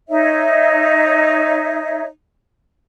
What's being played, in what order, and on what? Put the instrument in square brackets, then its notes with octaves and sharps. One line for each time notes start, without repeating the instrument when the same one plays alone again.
[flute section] D#4 C#5 E5